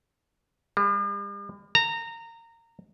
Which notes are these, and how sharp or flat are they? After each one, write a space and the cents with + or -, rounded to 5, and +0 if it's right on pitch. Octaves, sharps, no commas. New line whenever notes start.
G3 +45
A#5 -20